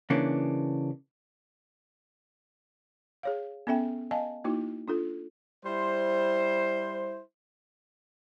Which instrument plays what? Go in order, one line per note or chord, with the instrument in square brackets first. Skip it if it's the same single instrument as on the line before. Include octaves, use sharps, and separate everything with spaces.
[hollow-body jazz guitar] C#3 E3 A#3 C#4 D4
[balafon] G#4 C#5 F5
B3 C#4 A4 E5 G5
D#5 F5 G#5 A5
A#3 D#4 E4 F#4
D4 F4 A4
[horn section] G3 E4 C5